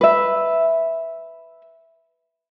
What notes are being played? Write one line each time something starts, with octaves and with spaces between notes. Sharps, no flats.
B4 E5